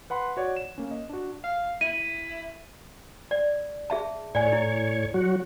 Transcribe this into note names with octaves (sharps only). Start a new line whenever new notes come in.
B4 F#5 B5 C6 F#6
F#4 C#5 D5 F#5
E7
A#3 C#4
D#5
D4 F#4
F5
E4 D#7
D5
G#4 E5 A5
A2 C#5 D5 G#5
E4
F#3 F#4